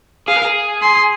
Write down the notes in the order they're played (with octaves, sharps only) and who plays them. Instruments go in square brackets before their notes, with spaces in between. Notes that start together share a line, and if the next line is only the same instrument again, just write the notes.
[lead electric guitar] G#4 [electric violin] F5
[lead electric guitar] A#4
G#4
[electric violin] C6